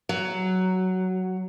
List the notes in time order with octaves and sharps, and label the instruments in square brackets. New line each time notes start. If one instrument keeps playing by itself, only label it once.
[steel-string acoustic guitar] F#3